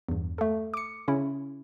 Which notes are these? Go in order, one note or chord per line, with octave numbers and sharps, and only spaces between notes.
E2 G2
A3 A4
D6 C#7
C#3 C#4 E4